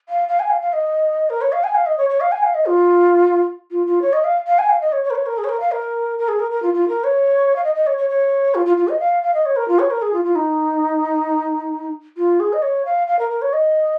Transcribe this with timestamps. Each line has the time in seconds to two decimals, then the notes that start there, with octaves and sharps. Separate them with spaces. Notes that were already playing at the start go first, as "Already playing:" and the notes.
0.09 F5
0.28 F5
0.39 G#5
0.50 F5
0.61 F5
0.73 D#5
1.30 A#4
1.41 C#5
1.52 F5
1.64 G#5
1.75 F5
1.86 D#5
1.98 C#5
2.10 C#5
2.21 F5
2.32 G#5
2.43 F5
2.54 D#5
2.66 F4
3.71 F4
3.87 F4
4.02 C#5
4.13 D#5
4.24 F5
4.47 F5
4.59 G#5
4.70 F5
4.81 D#5
4.92 C#5
5.04 C#5
5.10 A#4
5.15 C#5
5.26 A#4
5.38 G#4
5.44 C#5
5.49 A#4
5.60 F5
5.72 A#4
6.18 A#4
6.28 G#4
6.39 A#4
6.51 A#4
6.63 F4
6.74 F4
6.88 A#4
7.04 C#5
7.56 F5
7.64 D#5
7.75 D#5
7.87 C#5
7.98 C#5
8.09 C#5
8.55 F4
8.66 F4
8.77 F4
8.88 D#5
9.00 F5
9.23 F5
9.34 D#5
9.46 C#5
9.56 A#4
9.68 F4
9.79 C#5
9.91 A#4
10.02 G#4
10.13 F4
10.25 F4
10.35 D#4
12.17 F4
12.40 G#4
12.53 D#5
12.62 C#5
12.85 F5
13.08 F5
13.19 A#4
13.30 A#4
13.42 C#5
13.53 D#5